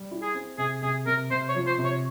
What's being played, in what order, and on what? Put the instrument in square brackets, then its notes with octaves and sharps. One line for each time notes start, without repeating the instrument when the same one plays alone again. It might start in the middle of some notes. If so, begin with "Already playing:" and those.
Already playing: [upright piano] G3
E4
[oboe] G#4
[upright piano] C4
[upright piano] C3 [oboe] G#4
[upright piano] C3 [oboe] G#4
[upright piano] C3 [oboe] A#4
[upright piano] C3 [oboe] C5
[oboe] C#5
[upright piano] F3
[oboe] C5
[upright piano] C3
[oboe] C#5